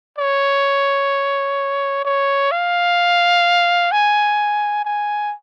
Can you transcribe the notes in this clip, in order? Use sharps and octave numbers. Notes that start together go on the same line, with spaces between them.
C#5
C#5
F5
G#5
G#5